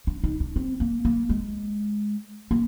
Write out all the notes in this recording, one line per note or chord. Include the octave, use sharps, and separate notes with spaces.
D4
D#4
D4
C4
A#3
A#3
G#3
A#3